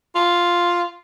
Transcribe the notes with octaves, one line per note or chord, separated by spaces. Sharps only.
F4